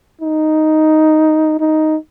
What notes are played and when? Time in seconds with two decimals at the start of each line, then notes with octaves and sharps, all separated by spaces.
0.21 D#4
1.60 D#4